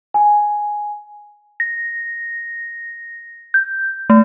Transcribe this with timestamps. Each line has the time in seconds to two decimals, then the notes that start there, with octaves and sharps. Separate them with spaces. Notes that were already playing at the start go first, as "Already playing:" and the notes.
0.14 G#5
1.60 A#6
3.54 G6
4.10 A3